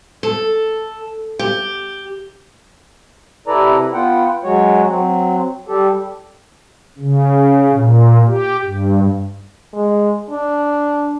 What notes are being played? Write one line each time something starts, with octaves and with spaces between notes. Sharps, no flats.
A4
G4
C3 E4 A4 B4 D5 A#5
B3 F4 F#5 G5
F#3 G#3 F#4 C#5
F#3 C4
G3 G4 A4
C#3
A#2
G4
G2
G#3
D4